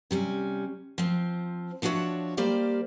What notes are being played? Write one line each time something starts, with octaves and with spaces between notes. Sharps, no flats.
C3 G3 C#4
F3 C4
F3 D4 F#4 G#4 C#5 E5
G3 A#3 G4 C5 D5 F5